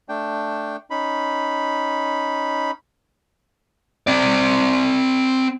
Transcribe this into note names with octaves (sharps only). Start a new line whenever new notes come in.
A3 D4 G5
C#4 D#4 B5
C4 D5